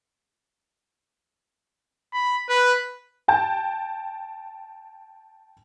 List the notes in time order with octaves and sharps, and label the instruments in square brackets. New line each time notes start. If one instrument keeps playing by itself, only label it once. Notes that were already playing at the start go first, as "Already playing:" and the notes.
[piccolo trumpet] B5
B4
[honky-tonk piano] G5 A5 G6